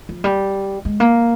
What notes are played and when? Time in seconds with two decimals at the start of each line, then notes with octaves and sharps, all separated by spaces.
0.09 F3
0.24 G3
0.85 G#3
1.00 A#3